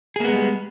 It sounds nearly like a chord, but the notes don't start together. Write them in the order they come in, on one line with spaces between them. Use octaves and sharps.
G#4 A#3 B3 G#3 G3